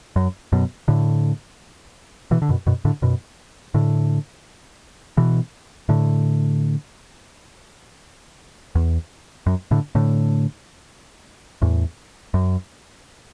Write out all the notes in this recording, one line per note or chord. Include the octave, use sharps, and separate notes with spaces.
F#2
F#2 B2
A2 D3
B2 E3
D3
F#2 B2
F#2 B2
A2 D3
F#2 B2
A2 D3
B2 E3
A2 D3
E2
F#2
A2 D3
A2 D3
E2 A2
F#2